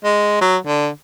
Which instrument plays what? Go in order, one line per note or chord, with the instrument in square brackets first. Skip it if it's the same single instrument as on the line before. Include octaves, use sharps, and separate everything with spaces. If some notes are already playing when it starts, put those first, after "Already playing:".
[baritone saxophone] G#3
F#3
D3